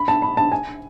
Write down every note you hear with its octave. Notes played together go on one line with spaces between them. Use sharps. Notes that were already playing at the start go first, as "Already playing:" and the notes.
Already playing: B5
A5
B5
A5
G#5